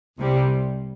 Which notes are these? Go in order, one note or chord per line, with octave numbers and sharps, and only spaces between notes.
C2 C3 G3